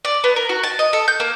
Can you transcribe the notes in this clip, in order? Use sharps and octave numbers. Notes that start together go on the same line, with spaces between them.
D5
B3
A#4
F#4
A5
D#5
A4
G6
A#3